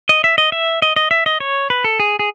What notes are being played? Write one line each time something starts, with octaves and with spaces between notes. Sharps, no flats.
D#5
E5
D#5
E5
D#5
D#5
E5
D#5
C#5
B4
A4
G#4
G#4